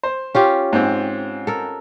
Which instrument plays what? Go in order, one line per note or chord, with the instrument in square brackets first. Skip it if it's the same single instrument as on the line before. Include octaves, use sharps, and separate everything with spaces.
[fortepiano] C5
[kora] C#4 F4 G4
[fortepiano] G#2 C4
[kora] A4 A#4